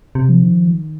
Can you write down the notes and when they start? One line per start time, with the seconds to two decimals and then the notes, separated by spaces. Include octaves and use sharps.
0.15 C3
0.29 F3
0.43 D#3